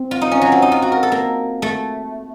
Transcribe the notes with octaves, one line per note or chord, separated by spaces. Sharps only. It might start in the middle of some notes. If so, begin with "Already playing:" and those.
Already playing: C4
F4
D#4
C#4
F#3
C4
D#4
F4
F#4
A#4
A4
A#3
A3